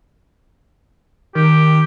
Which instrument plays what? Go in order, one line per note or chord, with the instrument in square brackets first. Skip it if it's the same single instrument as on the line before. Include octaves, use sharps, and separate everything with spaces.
[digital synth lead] D#3 [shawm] G4